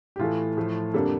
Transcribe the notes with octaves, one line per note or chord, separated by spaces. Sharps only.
G4
A2 E3 A3 F4
A2 F3 A3
F2 D3 G3 A#3 D4 A4